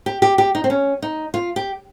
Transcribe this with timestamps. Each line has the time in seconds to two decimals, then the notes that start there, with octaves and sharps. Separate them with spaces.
0.06 G4
0.22 G4
0.38 G4
0.55 D#4
0.64 C4
0.70 C#4
1.02 D#4
1.34 F4
1.56 G4